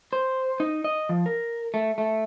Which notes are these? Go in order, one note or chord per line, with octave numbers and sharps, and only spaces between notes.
C5
D#4
D#5
F3
A#4
A3
A3